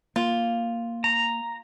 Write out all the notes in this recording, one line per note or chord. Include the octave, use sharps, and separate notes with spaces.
A#3 F4
A#5